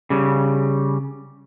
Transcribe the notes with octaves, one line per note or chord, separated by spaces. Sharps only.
C#3 G3